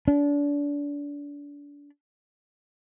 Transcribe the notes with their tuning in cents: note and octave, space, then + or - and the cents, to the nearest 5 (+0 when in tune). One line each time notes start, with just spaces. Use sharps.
D4 -30